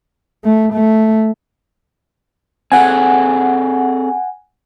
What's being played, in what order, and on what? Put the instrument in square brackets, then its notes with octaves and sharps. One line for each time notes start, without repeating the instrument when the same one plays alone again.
[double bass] A3
A3
[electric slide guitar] C4 G#4 A4 [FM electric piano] F#5 G#5